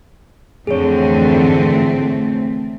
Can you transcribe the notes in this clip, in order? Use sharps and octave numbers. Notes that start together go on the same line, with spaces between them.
F2 A2 D3 E3 A3 C4 G#4 C#5